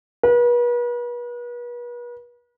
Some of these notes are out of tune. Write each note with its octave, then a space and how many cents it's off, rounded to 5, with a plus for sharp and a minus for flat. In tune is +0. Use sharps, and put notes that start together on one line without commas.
B4 -40